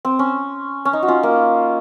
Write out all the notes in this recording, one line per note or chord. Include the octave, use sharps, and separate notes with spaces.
C4
C#4
C#4
D#4
F#4
C#4 F4
A#3